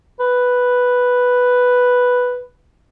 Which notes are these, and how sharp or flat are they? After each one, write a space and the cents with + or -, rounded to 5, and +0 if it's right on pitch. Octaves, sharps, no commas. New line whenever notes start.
B4 +0